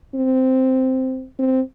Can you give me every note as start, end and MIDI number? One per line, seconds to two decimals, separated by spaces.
0.15 1.26 60
1.39 1.61 60